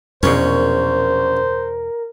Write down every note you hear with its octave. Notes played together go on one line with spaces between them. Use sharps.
A#1 E2 B2 C#4 A#4 C5